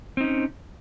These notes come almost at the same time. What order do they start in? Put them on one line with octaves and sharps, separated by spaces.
C4 D#4 C#4